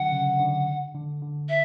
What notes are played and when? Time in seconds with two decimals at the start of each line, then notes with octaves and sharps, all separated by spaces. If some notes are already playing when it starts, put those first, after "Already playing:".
Already playing: D3 F#3 F#5
0.12 C#3
0.39 D3
0.94 D3
1.22 D3
1.49 E5